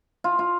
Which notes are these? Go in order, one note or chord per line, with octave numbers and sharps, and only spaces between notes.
F4
F4